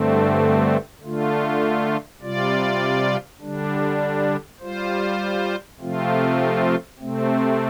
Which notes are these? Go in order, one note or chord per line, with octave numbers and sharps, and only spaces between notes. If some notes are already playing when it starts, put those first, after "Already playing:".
Already playing: G2 D3 A3 C4
D3 A3 F4
C3 G3 F4 D5
D3 G3 D4
G3 F4 C5
C3 F3 A3 C4 F4
C3 A3 C4